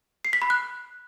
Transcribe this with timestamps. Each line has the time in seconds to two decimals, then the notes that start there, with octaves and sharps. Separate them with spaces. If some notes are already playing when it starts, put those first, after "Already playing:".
0.25 C7
0.33 B6
0.42 B5
0.50 F#6